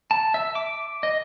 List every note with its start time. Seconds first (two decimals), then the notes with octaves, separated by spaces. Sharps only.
0.11 A5
0.34 E5
0.55 D6
1.03 D#5